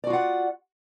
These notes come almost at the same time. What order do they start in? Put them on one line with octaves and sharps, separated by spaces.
D5 F#4 F4 F#5